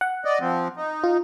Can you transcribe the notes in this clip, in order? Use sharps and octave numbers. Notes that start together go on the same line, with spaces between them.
F#5
D5 D#5
F3 C4
D#4
F4